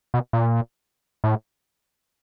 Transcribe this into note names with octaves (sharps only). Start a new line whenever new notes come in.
B2
A#2
A2